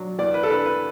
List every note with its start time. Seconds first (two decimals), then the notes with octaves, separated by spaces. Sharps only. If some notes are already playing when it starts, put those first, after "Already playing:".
Already playing: F#3 D4
0.19 E2 D5
0.34 B4
0.43 A4
0.50 D4 B4
0.66 B4